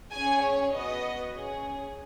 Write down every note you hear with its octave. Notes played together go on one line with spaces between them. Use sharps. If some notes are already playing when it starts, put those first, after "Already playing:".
C#4 G#4 G#5
C#5
B3 F#4 D#5
C#4 G#4